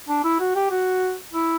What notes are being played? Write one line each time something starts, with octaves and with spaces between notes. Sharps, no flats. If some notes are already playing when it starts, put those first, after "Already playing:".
D4
E4
F#4
G4
F#4
E4